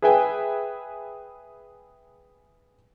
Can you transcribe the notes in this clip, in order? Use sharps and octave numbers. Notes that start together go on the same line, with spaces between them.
G#4 B4 E5 G5 G#5